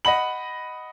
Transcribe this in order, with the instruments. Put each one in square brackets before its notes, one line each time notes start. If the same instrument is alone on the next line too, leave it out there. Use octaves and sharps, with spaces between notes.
[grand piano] D#5 F#5 B5 F#7